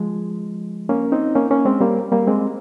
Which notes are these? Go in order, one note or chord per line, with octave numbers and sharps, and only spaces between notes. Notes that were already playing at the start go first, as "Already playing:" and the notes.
Already playing: F3 G#3
A#3 C#4
C4 D#4
A#3 C#4
A#3 C#4
G#3 C4
G3 A#3
G3 A#3
G#3 C4